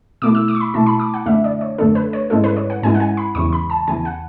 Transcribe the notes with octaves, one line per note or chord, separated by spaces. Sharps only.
B2 A3 E4 D6
E6
D6
C#6
B5
B2 A3 E4 A5
B5
D6
F#5
F#2 D3 A3 D4 E5
D5
C#5
F#2 D3 A3 D4 A4
B4
C#5
G#2 G#3 C#4 E4 A4
B4
C#5
F#5
G#2 G#3 C#4 E4 G#5
F#5
G#5
B5
E2 C#3 E3 C#6
B5
A5
E2 C#3 E3 G#5
F#5